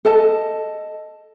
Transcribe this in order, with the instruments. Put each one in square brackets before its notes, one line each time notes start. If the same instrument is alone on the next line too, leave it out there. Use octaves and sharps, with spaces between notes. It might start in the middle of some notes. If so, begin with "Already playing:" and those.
[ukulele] A4 D#5 A5